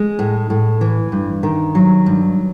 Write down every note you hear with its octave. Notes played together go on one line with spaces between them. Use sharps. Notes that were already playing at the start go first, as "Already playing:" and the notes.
Already playing: G#3
A2
A2
E3
G2
D#3
F#3
G2